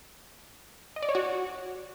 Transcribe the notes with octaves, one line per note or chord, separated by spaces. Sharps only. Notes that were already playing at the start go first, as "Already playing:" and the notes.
D#5
D5
C#5
F#4